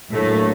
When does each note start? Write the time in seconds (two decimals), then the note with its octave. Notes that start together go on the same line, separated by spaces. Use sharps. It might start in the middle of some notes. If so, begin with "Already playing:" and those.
0.11 A2 D3 F#3 A3 A#3